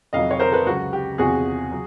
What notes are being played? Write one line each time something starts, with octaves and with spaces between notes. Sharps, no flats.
F2 C3 D#3 F#3 D#5 F5
C#5
A#4 C5
A4 B4
C#2 C#3 F#3 F#4
G4
E2 C3 F3 F#4 G#4
F#3